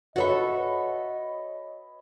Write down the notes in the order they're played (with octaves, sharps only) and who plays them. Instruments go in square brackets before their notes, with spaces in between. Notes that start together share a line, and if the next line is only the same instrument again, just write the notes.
[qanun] F#4 A4 E5 [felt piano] B4 C#5 B5 [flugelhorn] D#5